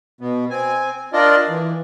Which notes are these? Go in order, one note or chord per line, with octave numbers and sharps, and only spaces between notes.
B2 B3
C4 G#5
D4 F4 A#4 D5 D#5
E3